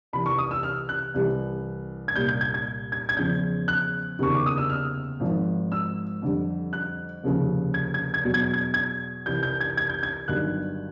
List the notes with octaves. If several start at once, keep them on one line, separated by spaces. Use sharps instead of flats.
C2 C3 E3 B5
C#6
D#6
E6
F6
F#6
C2 C3 E3 G3
G#6
C2 A#2 G3 G6
G6
G#6
G#6
G#6
G#6
E2 C#3 F3 G6
F#6
F#1 E2 C3 D#3 C#6
D6
D#6
E6
F6
G#1 G#2 F3
E6
F2 D3 G3
F#6
F1 D#2 C#3 F3
G#6
G#6
G#6
E2 B2 F#3
G#6
G#6
G#6
C2 C3 E3 G6
G6
G#6
G#6
G6
G#6
G1 G2 D#3 F#3 F#6